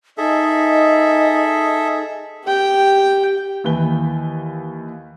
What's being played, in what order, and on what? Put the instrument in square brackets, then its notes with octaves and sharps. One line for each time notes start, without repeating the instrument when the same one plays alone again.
[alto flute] D#4 [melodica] G#4 [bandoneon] A4 E5 [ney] D#5
[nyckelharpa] G4 G5
[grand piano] D#2 E3 B4 G7